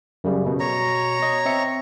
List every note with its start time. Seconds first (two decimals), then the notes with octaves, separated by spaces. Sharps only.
0.24 F#2 C#3 G3
0.46 B2
0.60 C#5 A#5
1.22 D#5
1.46 C4 E5 C#7